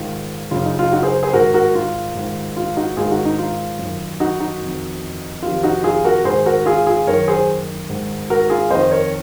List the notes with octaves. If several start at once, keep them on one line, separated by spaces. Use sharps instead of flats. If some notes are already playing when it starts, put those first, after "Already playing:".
Already playing: G#2 D#3 F4
F#2 C#3 F4
D#4
F4
D#4 F#4
G#4 C5
G#4 C5
G#2 D#3 F#4 A#4
F#4 A#4
F4
G#2 D#3
F4
D#4 F#4
G#2 D#3 F4 G#4
D#4 F#4
D#4
F4
F#2 D#3
D#4 F#4
D#4 F#4
F2 D#3
F2 C3 D#3 F4
D#4 F#4
F4 G#4
F#4 A#4
G#2 D#3 G#4 C5
F#4 A#4
F4 G#4
F4 G#4
F#2 D#3 A#4 C#5
G#4 C5
G#2 D#3
F#4 A#4
F4 G#4
F2 D#3 C5 D#5
A#4 C#5